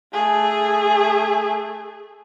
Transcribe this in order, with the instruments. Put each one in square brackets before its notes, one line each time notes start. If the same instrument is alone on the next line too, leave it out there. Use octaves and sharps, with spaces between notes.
[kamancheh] A3 G#4